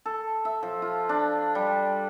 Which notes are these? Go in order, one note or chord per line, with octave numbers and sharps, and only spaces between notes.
A4
E5
F3
F4
D4
G3